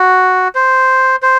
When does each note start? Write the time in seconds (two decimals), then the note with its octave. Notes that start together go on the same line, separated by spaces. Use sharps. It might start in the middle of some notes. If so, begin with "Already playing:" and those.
Already playing: F#4
0.55 C5
1.22 C5